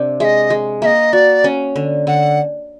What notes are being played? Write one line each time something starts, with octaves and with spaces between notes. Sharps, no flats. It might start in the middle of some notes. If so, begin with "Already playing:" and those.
Already playing: C3 D4
G#3 D#5 E5
G#3
A#3 D#5 E5
F#4 D5
C#4
D3
D3 F#5